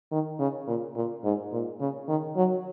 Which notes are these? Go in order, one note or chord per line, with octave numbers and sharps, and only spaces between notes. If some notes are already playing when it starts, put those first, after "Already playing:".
D#3
C#3
A#2
A#2
G#2
A#2
C#3
D#3
F#3